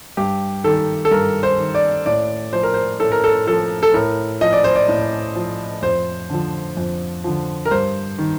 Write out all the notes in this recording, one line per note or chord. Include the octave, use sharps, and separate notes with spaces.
G2 G4
D#3 A4
A4
G2 A#4
C5
D#3
D5
A2 D5
F3 C5
A#4
C5
A2 A4
A#4
A4
F3 A4
A4
A2 A#4
F3 D#5
D5
C5
D5
A2
F3
F2 C5
D3 F3
F2
D3 F3
A#4
G2 C5
D#3